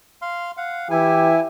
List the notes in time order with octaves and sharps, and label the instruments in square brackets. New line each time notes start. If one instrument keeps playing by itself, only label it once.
[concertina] F5 C6 F6
F5 F#5
[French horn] E3 [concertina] E4 G#5 [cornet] G4 [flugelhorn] E5